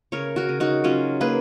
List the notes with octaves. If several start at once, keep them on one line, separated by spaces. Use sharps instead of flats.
C#3 A#4 C#5
F#4 A#4
C#3
D#4 F#4
F#3 C#4 F4
A#3 G#4 B4